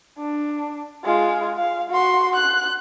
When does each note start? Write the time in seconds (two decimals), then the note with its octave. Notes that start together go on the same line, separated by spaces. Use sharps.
0.19 D4
1.04 G#3 F4
1.58 F5
1.90 F#4 C6
2.35 F#6